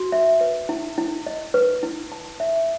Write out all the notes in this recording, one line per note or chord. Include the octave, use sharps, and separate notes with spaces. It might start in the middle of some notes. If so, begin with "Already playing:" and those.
Already playing: F#4
E5
B4
E4
E4
D#5
B4
E4
A5
E5